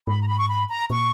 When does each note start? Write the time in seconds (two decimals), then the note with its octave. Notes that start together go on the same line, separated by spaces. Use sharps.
0.07 G#2 B5
0.21 A#5
0.27 B5
0.38 C#6
0.49 B5
0.69 A#5
0.90 A#2 C#6